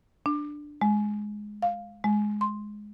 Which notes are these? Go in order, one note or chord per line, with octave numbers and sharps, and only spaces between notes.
D4
G#3
F5
G#3
C6